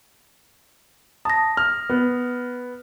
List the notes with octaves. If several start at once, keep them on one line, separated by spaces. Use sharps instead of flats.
A5 D#6 A#6
F6
B3